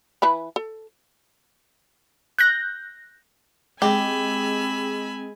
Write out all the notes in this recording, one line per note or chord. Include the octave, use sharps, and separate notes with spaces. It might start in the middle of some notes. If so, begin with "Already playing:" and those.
E3 B4 B5
A4
F#6 G6 A#6
G#3 C4 G4 G#5 B5 E6